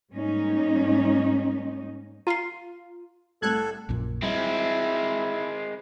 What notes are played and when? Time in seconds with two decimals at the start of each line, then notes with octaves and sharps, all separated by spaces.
0.12 G#2 G3 A#3 C#4 D#4
2.27 F4 A#5 C7
3.42 C2 A2 A4 E6 F#6 G#6
3.89 A#1 F#2 A#2
4.23 G3 G#3 C4 E4